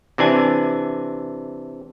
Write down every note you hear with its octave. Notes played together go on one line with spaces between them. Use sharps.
C3 E3 D4 G#5